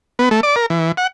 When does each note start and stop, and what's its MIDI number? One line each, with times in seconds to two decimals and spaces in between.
0.19 0.29 59
0.31 0.41 57
0.43 0.56 74
0.56 0.66 70
0.70 0.92 52
0.97 1.07 78